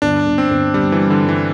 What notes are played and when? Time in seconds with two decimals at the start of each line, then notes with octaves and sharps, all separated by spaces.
0.02 G1 D4
0.26 G1
0.38 C4
0.50 G1
0.74 G1 G3
0.92 E3
0.98 G2
1.10 D3
1.23 G2
1.29 E3